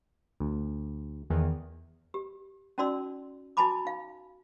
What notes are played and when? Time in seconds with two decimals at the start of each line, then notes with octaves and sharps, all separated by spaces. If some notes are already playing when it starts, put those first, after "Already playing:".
0.40 D2
1.30 E2 D#3 E3
2.14 G4
2.78 C#4 D#4 F#4 D5 C6 E6
3.57 E4 F#4 G#5 A5 B5 D6
3.85 D#4 F5